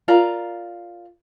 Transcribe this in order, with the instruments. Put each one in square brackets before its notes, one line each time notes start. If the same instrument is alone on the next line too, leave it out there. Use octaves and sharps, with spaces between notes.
[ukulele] F4 A#4 D5 A#5